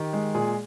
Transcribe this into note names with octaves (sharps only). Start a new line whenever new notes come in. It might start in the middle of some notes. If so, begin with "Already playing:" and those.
Already playing: D#3 G4
G#3
A#2 G#4